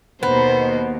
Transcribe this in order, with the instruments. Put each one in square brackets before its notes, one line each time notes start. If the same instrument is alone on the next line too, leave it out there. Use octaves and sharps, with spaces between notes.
[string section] D#2 B2 [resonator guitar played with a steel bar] B3 [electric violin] C5